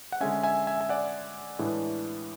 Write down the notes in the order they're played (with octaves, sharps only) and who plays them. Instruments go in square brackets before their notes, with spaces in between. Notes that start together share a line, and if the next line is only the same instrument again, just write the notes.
[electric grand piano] F#5
D3 G#3 C#4 E5 G#5
E5 G#5
E5 G#5
G#5
D5 F#5
A2 E3 G#3 D4